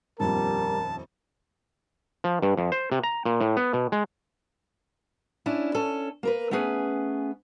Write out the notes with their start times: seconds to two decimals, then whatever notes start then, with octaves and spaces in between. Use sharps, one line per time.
0.20 D#1 A#1 F2 G3 A#4 A5
2.24 F3
2.42 G2
2.57 F2
2.72 C5
2.92 C3
3.04 A#5
3.25 A#2
3.41 A2
3.57 B3
3.73 B2
3.92 G#3
5.46 C#4 D4 E4
5.75 C#4 A4
6.23 A#3 A#4 B4
6.51 A3 B3 C#4 G#4 B4